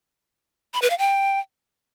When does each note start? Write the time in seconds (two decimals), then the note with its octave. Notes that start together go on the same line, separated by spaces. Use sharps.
0.74 B5
0.82 B4
0.90 F5
0.98 G5